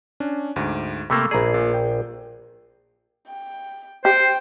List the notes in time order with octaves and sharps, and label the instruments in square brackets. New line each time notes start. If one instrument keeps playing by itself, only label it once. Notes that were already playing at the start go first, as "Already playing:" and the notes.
[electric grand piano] C#4 D4
D2 G#2
[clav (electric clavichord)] C3 A3 A#3 [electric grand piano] B5 C#6 E6
[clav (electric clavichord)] A#1 G#4 [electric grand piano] D5 A#5 B5
[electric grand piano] A#2
G5
[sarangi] G5
[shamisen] G4 [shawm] C5 [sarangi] G5